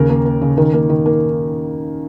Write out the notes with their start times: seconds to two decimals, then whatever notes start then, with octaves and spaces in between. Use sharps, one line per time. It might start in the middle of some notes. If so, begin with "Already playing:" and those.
Already playing: D#2 C#3 A#4
0.10 A#3
0.25 A#3
0.42 C#3
0.57 D#3 A#4
0.73 A#3
0.89 D#3
1.06 A#3